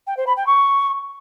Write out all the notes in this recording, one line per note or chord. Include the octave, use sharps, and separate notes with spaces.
G5
C5
B5
G5
C#6